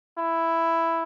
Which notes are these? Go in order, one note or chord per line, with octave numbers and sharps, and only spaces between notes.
E4